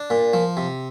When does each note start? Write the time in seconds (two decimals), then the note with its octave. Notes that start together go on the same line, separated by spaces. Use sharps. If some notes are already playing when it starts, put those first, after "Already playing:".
Already playing: D4
0.10 A#2
0.33 F3
0.57 C3